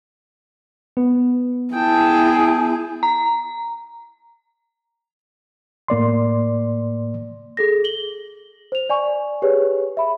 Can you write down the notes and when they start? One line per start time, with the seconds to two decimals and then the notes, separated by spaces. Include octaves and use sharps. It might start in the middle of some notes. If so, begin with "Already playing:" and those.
0.97 B3
1.74 E4 G#4 G5 A5
3.03 A#5
5.88 A2 A#3 D5 C6
7.57 G#4 A4 A#6
7.84 F#7 G7
8.72 C5 F7
8.90 D5 G#5 C#6
9.42 G4 G#4 B4 C#5
9.97 E5 B5